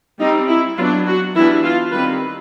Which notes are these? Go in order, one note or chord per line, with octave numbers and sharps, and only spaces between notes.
G3 C4 D#4
E4
F#3 B3 D4 F4
F#4
E3 G3 B3 D4 E4
F4
D#3 G3 C4 B4